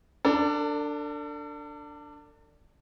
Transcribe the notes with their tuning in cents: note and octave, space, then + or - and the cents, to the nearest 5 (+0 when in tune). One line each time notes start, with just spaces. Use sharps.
D4 +0 A4 +40